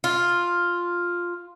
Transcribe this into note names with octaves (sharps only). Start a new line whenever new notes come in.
F4